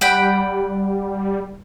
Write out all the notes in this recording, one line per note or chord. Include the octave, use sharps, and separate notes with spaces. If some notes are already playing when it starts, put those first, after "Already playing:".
G3 F#5 G5 B5